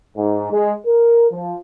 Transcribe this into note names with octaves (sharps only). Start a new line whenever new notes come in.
G#2
G#3
A#4
F3